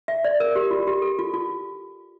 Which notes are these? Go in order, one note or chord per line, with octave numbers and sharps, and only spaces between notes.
E5
D5
A#4
G4
F4
G4
A4
F4
F4